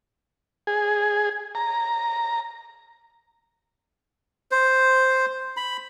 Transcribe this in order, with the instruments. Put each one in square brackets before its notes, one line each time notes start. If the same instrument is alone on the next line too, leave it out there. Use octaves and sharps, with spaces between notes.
[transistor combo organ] G#4
A#5
[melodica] C5
B5